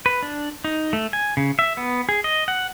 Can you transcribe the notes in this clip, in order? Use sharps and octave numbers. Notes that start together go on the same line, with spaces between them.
B4
D4
D#4
A3
G#5
C#3
E5
B3
G#4
D#5
F#5